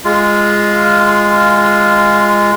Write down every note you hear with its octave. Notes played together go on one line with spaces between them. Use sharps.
G#3 F4